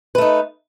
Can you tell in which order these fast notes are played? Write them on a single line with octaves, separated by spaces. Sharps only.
B4 A3 D#4